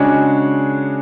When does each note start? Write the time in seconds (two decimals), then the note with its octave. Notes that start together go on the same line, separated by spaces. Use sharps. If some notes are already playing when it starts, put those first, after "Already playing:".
Already playing: C#3 G#3 D4 F#4 C#5